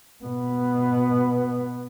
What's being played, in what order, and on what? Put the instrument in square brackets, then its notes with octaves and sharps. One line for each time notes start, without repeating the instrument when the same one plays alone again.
[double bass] B2 B3